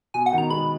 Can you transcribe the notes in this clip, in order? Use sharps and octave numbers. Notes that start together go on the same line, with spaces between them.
B2 G#5
F#5
B2 D#3
A#5
G#3 B3 B5